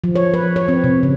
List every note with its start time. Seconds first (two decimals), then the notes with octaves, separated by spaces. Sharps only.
0.04 F3
0.15 C#5
0.34 B4
0.56 C#5
0.68 C4
0.84 C3
1.03 C#3